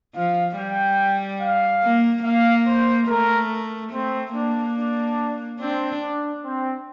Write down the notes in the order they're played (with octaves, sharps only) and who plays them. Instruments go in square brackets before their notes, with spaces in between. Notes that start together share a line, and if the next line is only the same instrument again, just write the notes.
[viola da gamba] F3 [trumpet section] F5
[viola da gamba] G3 [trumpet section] G5
[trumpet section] F5
[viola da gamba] A#3
[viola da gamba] A#3 [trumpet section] F5
[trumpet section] C5
[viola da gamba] A3 [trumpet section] A#4
[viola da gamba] A3 [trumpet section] C4
[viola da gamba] A#3 [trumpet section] D4
[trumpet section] D4
[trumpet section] C4 [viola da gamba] D4
[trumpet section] D4
C4